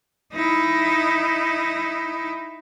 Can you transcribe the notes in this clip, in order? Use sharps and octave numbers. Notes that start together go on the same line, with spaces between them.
D#4 E4